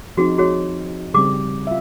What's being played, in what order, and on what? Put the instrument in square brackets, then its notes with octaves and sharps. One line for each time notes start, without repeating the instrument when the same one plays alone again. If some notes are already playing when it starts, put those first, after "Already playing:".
[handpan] F3 C4 D#4 [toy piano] F#4 G#4
[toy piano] F#4 G#4 C#5
[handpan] C#3 G3 C4 [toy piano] G#4 D6
[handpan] F4 E5